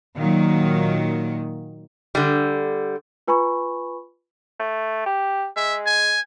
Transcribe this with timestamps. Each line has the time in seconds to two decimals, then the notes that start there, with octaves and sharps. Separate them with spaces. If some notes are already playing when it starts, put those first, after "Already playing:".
0.17 A#2 D#3 F#3
2.15 D3 G3
3.27 F4 B4 G#5 B5 C#6
4.59 A3
5.06 G4
5.56 G#3 E5
5.86 G#5